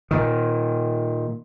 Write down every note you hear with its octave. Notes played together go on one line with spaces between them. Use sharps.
A#2 D#3